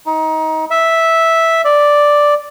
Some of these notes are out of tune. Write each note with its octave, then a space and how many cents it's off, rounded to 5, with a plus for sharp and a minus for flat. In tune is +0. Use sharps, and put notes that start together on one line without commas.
D#4 +25
E5 -5
D5 +0